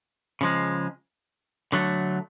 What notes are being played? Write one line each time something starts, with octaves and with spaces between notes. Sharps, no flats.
C#3 F3 G#3
D3 F#3 A3